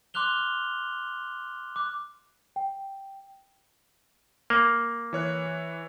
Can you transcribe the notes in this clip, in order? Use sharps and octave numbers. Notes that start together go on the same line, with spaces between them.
C6 D6 F6 F#6 F7 G7
D6 F#6
G5
A#3
E3 C#5 F#6